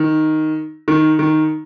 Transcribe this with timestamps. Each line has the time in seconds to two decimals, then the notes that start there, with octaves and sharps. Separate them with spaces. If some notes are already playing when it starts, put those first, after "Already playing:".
Already playing: D#3
0.88 D#3
1.19 D#3